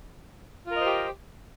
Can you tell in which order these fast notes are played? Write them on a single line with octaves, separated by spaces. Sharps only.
F4 A#4 D#5 C5 G4